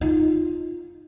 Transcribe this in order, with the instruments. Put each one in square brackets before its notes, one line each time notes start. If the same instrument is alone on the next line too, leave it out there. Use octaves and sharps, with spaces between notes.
[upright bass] D#4 F4